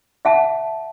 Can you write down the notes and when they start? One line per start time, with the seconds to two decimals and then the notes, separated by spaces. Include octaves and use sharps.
0.25 E5 F#5 A5